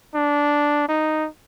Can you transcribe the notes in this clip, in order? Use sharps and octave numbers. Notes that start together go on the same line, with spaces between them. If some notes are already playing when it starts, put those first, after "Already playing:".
D4
D#4